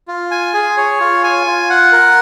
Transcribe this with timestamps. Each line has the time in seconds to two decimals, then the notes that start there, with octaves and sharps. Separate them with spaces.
0.08 F4
0.31 G#5
0.54 G#4
0.77 C#5
1.00 F4
1.24 G#5
1.47 F4
1.70 F#5
1.92 A#4